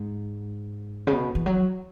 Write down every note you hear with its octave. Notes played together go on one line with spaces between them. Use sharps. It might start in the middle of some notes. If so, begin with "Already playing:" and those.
Already playing: G#2
C#3
B2
E3
F#3